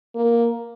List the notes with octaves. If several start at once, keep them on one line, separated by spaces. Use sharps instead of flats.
A#3